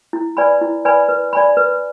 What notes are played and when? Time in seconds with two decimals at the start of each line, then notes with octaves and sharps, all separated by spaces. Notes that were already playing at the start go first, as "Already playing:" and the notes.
0.13 E4
0.37 B4 D5 G#5 B5
0.61 E4
0.85 B4 D5 G#5 B5
1.09 B4
1.33 D5 G#5 B5
1.57 B4